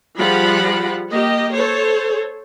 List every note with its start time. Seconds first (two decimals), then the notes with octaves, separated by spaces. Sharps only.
0.18 F3 G3 F4 G#4 F#5 B5
1.11 A#3 G4 D#5
1.54 A4 C5 C#5